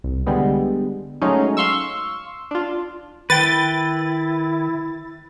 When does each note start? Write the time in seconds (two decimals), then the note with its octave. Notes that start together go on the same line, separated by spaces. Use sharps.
0.04 C2
0.27 D3 G3 G#3 B3
1.21 F#3 G#3 A3 C#4 D#4
1.57 F5 C6 C#6 E6
2.51 D4 F4
3.30 D#3 E4 B4 G5 A6